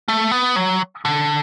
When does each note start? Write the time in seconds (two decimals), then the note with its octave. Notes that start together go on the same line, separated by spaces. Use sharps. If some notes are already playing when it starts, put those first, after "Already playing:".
0.08 A3
0.32 B3
0.56 F#3
1.05 D3